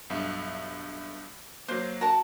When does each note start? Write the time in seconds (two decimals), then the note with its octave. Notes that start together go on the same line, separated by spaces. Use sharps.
0.10 B1 G2 E5
1.68 F#3 A#3 C5
2.01 F#4 A#4 A5